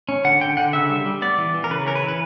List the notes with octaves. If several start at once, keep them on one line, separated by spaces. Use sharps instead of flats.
C#4
D3 F#5
D3 G5
D3 F#5
C#3 E5
G3
G3
B3 D5
E3
E3
A#4
C#3 B4
C#4 A#4
B4
E3
B4